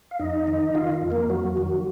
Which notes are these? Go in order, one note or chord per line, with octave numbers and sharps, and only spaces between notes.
F5
F2 D#4 D#5
D#3
D#3 F4 F5
F2
A#3 A#4
F2 F#3 F#4
D#3